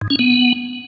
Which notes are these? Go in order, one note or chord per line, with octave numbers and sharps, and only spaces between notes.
G#2
C#4
B3